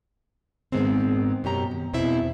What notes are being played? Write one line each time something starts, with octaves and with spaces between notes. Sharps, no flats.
G#2 D#3 G#3 B3 C4
F#2 B2 G4 A#5
D#3
E2 B2 C4 E4 E5